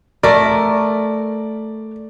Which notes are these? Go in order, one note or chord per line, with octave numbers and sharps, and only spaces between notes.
A3 A#4 D5